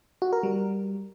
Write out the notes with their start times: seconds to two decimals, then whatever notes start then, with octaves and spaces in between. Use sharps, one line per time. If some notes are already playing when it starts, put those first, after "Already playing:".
0.22 F#4
0.33 A#4
0.43 G3